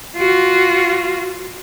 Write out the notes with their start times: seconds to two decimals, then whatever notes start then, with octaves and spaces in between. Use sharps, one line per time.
0.17 F4 F#4